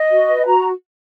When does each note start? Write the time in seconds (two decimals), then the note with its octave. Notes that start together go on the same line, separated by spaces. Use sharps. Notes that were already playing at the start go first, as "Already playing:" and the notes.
Already playing: D#5
0.11 F#4
0.28 B4
0.46 F#4 A#5